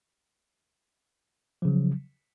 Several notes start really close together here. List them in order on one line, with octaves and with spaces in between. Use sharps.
F3 C#3 F#3